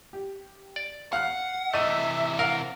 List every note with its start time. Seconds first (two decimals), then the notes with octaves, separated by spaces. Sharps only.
0.13 G4
0.76 D5
1.13 F5 F#5 F6 F#6
1.74 C3 E3 A3 D#5 E5 D#7
2.39 A#4 F5 F#5